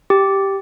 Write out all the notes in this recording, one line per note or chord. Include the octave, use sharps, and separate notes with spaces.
G4